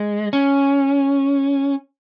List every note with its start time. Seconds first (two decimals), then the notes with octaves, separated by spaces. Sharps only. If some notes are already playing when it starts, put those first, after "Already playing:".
Already playing: G#3
0.33 C#4